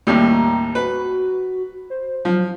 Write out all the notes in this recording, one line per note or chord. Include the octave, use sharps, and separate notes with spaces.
D#2 A2 G3
A#5
F#4 B4
C5
F3 F#3